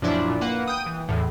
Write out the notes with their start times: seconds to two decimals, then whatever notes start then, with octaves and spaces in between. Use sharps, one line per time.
0.02 F#2 A#2 F3 D4 E4
0.29 A#2
0.41 A#3 B4 F#5
0.68 G5 D#6
0.86 E3
1.09 E2 A2